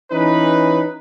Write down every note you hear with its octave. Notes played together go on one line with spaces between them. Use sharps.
E3 C#4 D#4 B4